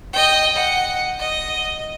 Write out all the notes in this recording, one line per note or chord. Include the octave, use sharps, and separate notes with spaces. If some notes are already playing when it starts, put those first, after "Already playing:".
D#5 G5
F#5
D#5